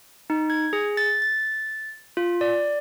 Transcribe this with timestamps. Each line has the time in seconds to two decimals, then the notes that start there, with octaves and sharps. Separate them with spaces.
0.30 D#4
0.50 G#6
0.73 G#4
0.97 A6
1.22 A6
2.17 F4
2.41 D5